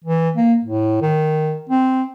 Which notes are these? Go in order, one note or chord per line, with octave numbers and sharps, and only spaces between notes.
E3
A#3
A2
D#3
C4